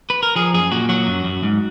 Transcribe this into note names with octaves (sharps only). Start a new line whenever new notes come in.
B4
A#4
F3 G#4
F#2 G#4
A#2 F#4
F#3 F#4
F#2
F#2
G#2